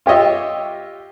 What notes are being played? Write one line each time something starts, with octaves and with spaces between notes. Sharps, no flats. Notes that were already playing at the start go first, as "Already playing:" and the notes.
F4 G4 C#5 D#5 E5